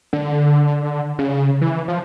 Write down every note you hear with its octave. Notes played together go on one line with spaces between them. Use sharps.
D3
C#3
E3
F3